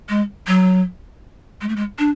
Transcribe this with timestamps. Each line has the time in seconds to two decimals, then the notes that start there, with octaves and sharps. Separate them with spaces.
0.09 G#3
0.47 F#3
1.61 G#3
1.69 A3
1.76 G#3
1.99 D4